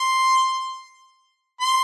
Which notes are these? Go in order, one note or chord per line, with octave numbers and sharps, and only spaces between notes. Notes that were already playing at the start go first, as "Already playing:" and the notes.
Already playing: C6
C6